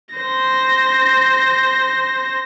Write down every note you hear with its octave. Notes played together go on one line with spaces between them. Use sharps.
C5 A#6